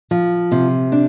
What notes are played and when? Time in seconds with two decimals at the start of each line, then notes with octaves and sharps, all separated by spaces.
0.11 F3
0.52 C3
0.92 D4